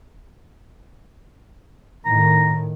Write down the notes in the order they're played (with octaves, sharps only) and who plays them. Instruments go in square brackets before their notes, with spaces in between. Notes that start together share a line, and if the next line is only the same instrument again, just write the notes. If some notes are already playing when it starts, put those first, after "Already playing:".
[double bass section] A2 D#3 [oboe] A#5